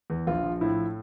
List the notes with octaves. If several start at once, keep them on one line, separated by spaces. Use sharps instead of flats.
E2
A#1 F4
F3
A2 E4